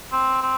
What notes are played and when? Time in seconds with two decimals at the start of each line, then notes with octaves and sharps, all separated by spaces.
0.12 C4
0.42 C4